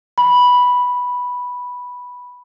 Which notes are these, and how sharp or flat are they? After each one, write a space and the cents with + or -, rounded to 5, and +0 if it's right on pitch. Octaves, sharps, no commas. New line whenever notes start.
B5 -5